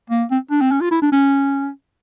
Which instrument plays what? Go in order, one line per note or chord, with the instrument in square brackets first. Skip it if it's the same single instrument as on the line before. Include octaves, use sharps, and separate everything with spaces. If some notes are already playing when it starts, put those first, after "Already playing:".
[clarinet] A#3
C4
D4
C4
C#4
F4
E4
D4
C#4